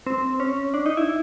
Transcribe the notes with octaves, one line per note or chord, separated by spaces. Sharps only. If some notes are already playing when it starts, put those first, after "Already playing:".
C4
C#4
D4
D#4
E4